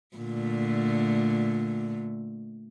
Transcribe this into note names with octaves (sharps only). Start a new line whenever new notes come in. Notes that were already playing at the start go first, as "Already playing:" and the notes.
A#2 D3 A3